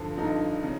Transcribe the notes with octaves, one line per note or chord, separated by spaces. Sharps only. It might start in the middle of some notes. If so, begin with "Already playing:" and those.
Already playing: G2 D3 F3
G2 D3 F3 D#4
C#3